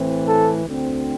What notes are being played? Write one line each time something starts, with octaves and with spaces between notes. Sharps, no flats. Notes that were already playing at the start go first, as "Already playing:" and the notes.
Already playing: A2 E3 C4
A4
D2 D3 C4